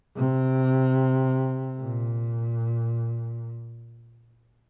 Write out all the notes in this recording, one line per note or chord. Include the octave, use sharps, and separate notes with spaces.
C3
A#2